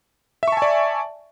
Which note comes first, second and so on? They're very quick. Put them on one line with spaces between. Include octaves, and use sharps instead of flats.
E5 C#6 A5 G#5 D5